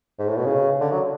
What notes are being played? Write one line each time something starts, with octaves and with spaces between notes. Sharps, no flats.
G#2
A2
B2
C#3
D3
F#3